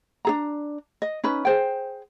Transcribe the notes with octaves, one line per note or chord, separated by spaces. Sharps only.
D4 G#4 A#5
D#5
C#4 D#4 B4
G#4 C5 G5